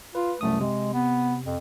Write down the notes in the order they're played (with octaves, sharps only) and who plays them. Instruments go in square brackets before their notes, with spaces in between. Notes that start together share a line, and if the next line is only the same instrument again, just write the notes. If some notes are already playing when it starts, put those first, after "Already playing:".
[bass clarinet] F4 [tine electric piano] B4
[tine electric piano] C2 F#2 D#6 [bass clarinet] A3
[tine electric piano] C3 [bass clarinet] G#3
[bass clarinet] B3
F2